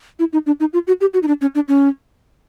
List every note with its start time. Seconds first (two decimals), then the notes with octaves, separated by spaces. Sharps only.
0.19 E4
0.33 D#4
0.47 D4
0.60 D#4
0.73 F4
0.87 F#4
1.01 G4
1.14 F#4
1.23 D#4
1.28 D4
1.41 C#4
1.55 D4
1.68 C#4